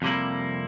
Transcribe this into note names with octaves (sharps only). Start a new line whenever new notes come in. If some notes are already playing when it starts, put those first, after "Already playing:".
F2 C3 G3 A#3 E4